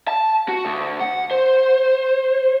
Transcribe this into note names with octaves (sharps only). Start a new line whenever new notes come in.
A5
F#4
D2
F#5
C5